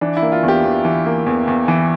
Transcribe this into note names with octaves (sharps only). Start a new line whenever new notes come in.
E3 D4
E4
A#3
F4
E2
G4
E2
E3
A#3
E2
E2
E3